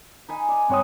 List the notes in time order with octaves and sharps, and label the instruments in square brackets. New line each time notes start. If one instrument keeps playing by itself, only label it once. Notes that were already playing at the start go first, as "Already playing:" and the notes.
[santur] D#4 B4 G#5
D5 G#5
[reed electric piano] G2 C#5 D#6 [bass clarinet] C4 [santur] D#4 F#5